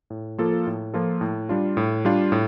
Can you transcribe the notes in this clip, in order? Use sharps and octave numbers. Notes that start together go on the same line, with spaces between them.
A2
F3 A#3 F4 A4
A2
F3 A#3 F4 A4
A2
G3 D4 F4
A2
G3 D4 F4
A2